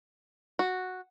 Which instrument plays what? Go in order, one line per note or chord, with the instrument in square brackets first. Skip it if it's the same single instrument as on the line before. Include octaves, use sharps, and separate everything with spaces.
[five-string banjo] F#4